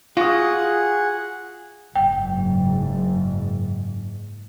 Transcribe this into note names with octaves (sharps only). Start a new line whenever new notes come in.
F4 F#4 G#4 F#5 D#6
F#1 G#2 G5